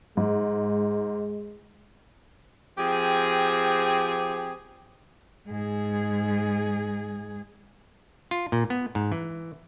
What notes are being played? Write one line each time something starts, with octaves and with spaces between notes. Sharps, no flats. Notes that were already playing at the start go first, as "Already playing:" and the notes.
G#2 G#3
F3 C4 G4 G#4
G#2 G#4
F4
A#2
B3
G#2
E3